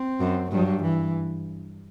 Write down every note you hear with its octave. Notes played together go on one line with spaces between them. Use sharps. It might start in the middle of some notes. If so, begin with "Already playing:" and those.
Already playing: C4
F#2
G2 F#3
E3